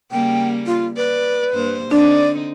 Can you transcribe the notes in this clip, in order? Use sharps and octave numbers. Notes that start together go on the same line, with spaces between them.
C#3 G3 A#3 G5
F4
B4 D5
G2 A#3 C5
D3 C4 D4 D#4 D5